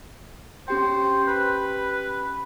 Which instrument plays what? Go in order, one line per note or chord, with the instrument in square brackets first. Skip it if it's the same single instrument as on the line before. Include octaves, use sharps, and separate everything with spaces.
[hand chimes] C#4 G4 G5 [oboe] C5
[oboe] B4